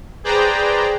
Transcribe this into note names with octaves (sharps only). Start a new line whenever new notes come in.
G#4 B4 C5 D5 G5 A#5